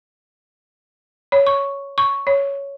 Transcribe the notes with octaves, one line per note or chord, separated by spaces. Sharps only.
C#5
C#6
C#6
C#5